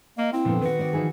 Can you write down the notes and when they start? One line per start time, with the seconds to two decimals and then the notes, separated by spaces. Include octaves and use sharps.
0.18 A#3 D#5
0.33 C4 E4
0.45 F2 A#2 D3 F3 B3
0.62 D#3 F#4 B4
0.79 C4 D5
0.93 E3 F3 D#4 G#4